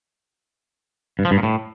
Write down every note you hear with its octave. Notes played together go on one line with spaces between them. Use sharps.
G2
F3
G2
A#2
A2